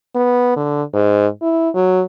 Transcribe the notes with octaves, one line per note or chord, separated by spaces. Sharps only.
B3
D3
G#2
E4
F#3